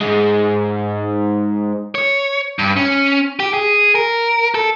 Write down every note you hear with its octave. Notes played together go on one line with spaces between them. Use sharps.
G#2 G#3
C#5
G2
C#4
G4
G#4
A#4
A4